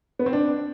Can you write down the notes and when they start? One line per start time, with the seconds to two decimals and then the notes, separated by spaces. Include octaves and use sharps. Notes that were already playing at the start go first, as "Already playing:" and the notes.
0.19 B3
0.26 C4
0.33 D4